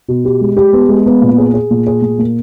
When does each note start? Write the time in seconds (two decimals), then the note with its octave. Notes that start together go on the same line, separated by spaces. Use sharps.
0.08 B2
0.25 G4
0.41 G#3
0.57 G4
0.73 B3
0.89 G#3
1.06 B3
1.22 A#2
1.38 G#4
1.54 G#4
1.71 A#2
1.87 G#4
2.02 A#2
2.19 A#3